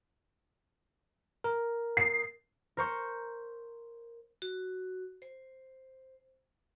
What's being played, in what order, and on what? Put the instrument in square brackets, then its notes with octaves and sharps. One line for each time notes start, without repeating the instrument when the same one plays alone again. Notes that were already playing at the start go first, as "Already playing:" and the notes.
[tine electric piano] A#4
[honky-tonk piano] C7
[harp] A#4 C5 C#6 G6
[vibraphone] F#4
C5